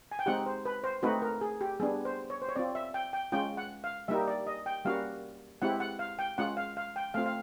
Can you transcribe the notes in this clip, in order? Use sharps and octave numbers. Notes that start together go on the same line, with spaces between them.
G#5
G5
G#3 C4 D#4 G4 F#5
C5
B4
C5
A3 C4 D#4 F#4 B4
A#4
G#4
G4
G3 B3 D4 G#4
C5
C#5
C5
C#5
C4 F4 D5
E5
G5
G5
G#3 C#4 F4 G5
F#5
F5
G3 A#3 D#4 G4 E5
D5
D#5
G5
G3 A#3 C#4 F#4 F5
G#3 C4 E4 G4 F#5
F#5
F5
G5
G#3 C#4 F4 F#5
F5
F5
G5
A3 C4 F4 F5
F5